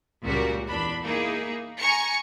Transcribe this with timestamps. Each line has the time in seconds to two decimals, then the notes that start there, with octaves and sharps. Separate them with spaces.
0.24 C#2 A#2 G3 F#4 A#4
0.68 E2 D4 B5
1.04 A#3 D#4 E4 G#4
1.79 G#5 A#5 C#6 C#7